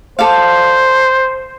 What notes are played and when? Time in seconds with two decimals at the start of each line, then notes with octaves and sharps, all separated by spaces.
0.19 A4 C5 D5 F5